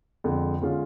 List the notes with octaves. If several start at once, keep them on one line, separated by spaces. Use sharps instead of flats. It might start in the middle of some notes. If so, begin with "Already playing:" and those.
F2 D3 G#3
D3 G#3 C#4 F4